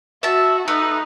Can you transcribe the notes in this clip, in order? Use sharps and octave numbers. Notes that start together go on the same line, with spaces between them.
F#4 E5 A5
A3 D#4 B4